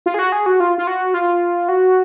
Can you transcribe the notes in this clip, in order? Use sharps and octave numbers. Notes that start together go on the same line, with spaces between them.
F4
G#4
F#4
G#4
F#4
F4
F4
F#4
F4
F#4